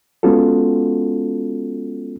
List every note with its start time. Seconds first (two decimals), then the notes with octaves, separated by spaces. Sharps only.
0.23 G#3 B3 C#4 F4 F#4 A4